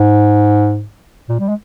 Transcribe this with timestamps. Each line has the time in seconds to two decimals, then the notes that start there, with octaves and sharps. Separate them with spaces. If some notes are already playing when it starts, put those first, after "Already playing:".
Already playing: G#2
1.29 A#2
1.40 G3
1.49 G#3